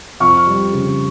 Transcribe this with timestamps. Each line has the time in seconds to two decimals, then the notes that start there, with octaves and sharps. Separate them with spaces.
0.20 F2 C#6 F6
0.47 G3
0.73 C#3